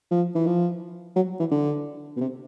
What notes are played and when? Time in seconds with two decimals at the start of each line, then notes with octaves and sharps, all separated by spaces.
0.11 F3
0.35 E3
0.46 F3
1.16 F#3
1.40 E3
1.51 D3
2.17 B2
2.21 C3